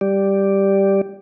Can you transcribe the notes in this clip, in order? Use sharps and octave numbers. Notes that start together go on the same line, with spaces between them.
G3 G4 D5